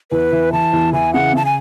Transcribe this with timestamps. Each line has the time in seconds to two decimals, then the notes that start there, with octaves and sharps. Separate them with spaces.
0.11 E2 B4
0.32 E3
0.52 E3 A5
0.73 E2
0.93 E3 G#5
1.13 C#3 F#5
1.33 C#3 A5
1.45 G#5